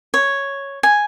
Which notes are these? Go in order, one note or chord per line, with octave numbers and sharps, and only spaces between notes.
C#5
G#5